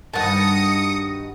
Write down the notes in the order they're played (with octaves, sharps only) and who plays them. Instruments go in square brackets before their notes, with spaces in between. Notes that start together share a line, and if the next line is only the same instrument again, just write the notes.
[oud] G2 D#3 [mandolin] F#4 A5 [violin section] D#6 A#6 C#7